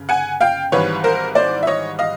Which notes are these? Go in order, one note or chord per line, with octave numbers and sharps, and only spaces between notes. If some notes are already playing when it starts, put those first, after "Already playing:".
Already playing: G1 C#3
F#5 G#5
F5 G5
G#1 G#2 E3 G3 B4 C#5
A#4 C5
C5 D5
E5
C#5 D#5
D#5 F5